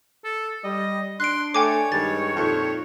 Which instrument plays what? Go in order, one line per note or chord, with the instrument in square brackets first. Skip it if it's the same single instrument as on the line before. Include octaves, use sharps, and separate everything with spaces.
[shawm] A4
[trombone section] G3 [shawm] D#5
[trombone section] D4 [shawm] C6 [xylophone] F#6 D7
[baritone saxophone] A3 [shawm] C#5 [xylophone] G5 G#5 D6
[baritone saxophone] G2 [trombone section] D#3 G#3 [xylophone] A6
[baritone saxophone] F2 [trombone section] A#2 D#4